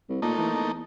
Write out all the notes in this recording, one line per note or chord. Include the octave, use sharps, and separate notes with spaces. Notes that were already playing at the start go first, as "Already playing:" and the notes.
C2
A#2 A3 A#3 D#4
E3
E2